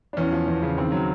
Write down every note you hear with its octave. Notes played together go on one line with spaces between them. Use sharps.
D4
E2 C#4
F3
E2
C#3
D#2 C4
F#3